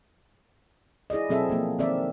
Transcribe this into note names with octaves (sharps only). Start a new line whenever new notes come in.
E4 G#4 D5 D#5
B2 F#3 C4 G#4 A4 E5
F3 A#3
D#3 C4 A#4 D5 E5